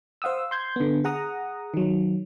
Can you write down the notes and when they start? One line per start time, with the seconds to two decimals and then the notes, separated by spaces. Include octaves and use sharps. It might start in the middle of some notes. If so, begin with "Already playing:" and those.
0.22 C5 F5 F#5 D#6 E6
0.51 C6 G6 G#6
0.76 D3 B3
1.04 G#4 F#5 A#5 D#6
1.74 D#3 F#3